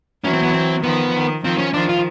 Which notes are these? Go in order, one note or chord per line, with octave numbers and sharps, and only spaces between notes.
E3 F#3 C#4
C4
B3
C4
D#3 F3 B3
D#3
D#3 F3 C4
C#4
D#3 F3 D4
F4